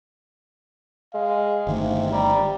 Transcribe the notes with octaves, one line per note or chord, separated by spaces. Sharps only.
G#3 F5
G1 C3 D#3 A3
G3 A#5